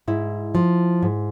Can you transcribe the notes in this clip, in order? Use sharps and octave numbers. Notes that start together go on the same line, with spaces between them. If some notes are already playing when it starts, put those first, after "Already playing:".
G#2 E4
F3
G#2